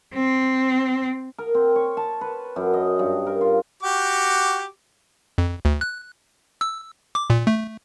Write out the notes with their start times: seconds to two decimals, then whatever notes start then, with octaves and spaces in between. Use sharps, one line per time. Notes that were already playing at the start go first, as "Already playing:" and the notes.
0.14 C4
1.38 A#4
1.55 C4
1.76 C#5
1.97 A5
2.21 B4
2.56 F#2
2.73 D#5
2.99 G2
3.27 A#4
3.41 F4
3.83 F#4 G4 D6
5.38 F2
5.65 D2
5.81 F#6
6.61 E6
7.15 D6
7.30 A#2
7.47 A3